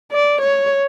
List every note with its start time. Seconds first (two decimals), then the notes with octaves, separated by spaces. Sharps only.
0.12 D5
0.41 C#5